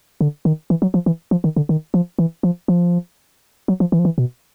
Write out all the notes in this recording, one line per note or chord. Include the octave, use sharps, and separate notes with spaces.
D3
D#3
E3
F#3
F3
E3
F3
D#3
D3
D#3
F3
E3
F3
F3
F#3
F3
E3
F3
E3
B2